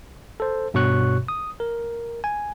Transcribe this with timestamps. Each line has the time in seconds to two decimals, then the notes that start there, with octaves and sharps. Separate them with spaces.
0.40 A4 C5
0.74 G2 B2 F#4 C#5 C#6 F#6
1.28 D#6
1.60 A#4
2.24 G#5